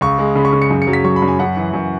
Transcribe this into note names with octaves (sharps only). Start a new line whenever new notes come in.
C#2 C#6
G#3
C#3 B5
C#6
C#3
C#7
F#2
C#7
F#3
B6
F#3 C#6
B5
F#2
G#5
F#2 F#5
E3
F#2